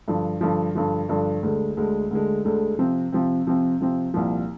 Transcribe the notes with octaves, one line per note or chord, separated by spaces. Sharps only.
G2 D3 F3
G2 D3 F3
G2 D3 F3
G2 D3 F3
D2 D3 G#3
D2 D3 G#3
D2 D3 G#3
D2 D3 G#3
C3 F3 C4
C3 F3 C4
C3 F3 C4
C3 F3 C4
C2 A#2 F3